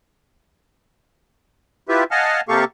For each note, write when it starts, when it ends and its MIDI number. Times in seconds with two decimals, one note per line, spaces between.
1.89 2.04 64
1.89 2.04 65
1.89 2.04 67
1.89 2.04 71
1.89 2.04 76
2.11 2.41 75
2.11 2.41 77
2.11 2.41 78
2.11 2.41 80
2.11 2.41 81
2.11 2.41 89
2.49 2.64 48
2.49 2.64 58
2.49 2.64 67
2.49 2.64 69
2.49 2.64 77
2.49 2.64 85